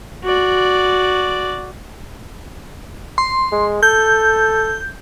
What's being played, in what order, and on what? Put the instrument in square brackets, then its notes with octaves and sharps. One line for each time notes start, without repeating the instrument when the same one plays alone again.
[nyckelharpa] F#4 D5
[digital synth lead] C6
[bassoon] G#3
[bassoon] A4 [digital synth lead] G6